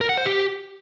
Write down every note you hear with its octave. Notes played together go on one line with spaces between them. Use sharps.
A#4
F#5
C5
G4